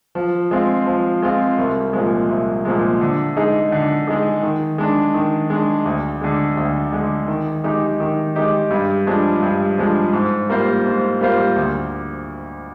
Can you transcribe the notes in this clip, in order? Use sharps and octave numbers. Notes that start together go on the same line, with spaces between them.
F3
G#3 C4 F4
F3
G#3 C4 F4
C2
A#2 F3 G#3
C2
A#2 F3 G#3
D3
G#3 D#4 G#4
D3
G#3 D#4 G#4
D#3
G#3 D4
D#3
G#3 D4
D2
D3 G#3
D2
D3 G#3
D#3
G#3 D#4 G4
D#3
G#3 D#4 G4
G2
F3 G#3 D4
G2
F3 G#3 D4
G#2
G3 A#3 F4 C5
G#2
G3 A#3 F4 C5
D2